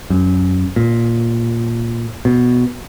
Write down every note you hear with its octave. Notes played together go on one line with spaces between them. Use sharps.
F#2
A#2
B2